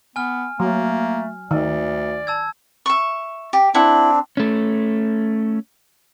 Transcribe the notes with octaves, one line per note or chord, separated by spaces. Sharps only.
B3 G#5 F6
F#3 A3 A#3
D2 D#3 D5
A5 E6 G#6
E5 C#6
G4
C4 D4 E4 F#5
A3 C#4